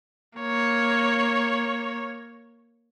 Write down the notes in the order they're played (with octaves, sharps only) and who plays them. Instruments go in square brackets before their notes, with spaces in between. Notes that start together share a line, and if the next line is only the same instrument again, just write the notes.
[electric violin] A#3 C#5